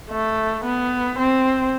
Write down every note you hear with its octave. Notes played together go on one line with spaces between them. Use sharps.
A3
B3
C4